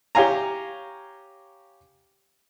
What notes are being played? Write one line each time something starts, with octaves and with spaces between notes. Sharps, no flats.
G4 C#5 F5 G#5 A#5